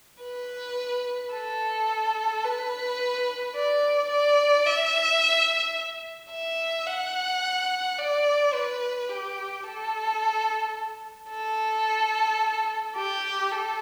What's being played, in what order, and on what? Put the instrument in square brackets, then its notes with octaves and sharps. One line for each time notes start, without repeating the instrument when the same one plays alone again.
[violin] B4
A4
B4
D5
D5
E5
E5
F#5
D5
B4
G4
A4
A4
G4
A4